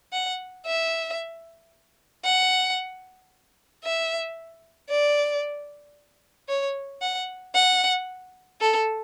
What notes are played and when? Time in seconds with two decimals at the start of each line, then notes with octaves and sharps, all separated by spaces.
0.13 F#5
0.66 E5
2.25 F#5
3.84 E5
4.90 D5
6.49 C#5
7.02 F#5
7.55 F#5
8.61 A4